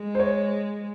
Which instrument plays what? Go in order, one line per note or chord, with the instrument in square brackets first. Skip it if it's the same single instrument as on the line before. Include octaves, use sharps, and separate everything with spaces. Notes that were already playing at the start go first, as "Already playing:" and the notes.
Already playing: [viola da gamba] G#3
[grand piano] C5
C#5